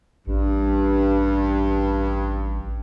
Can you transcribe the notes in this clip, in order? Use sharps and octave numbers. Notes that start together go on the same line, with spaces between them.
A1 G2